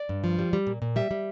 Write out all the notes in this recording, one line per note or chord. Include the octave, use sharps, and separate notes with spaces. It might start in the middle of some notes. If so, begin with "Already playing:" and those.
Already playing: D5
G2
F3
G3
G3
A#2
A#2
G3 E5
G3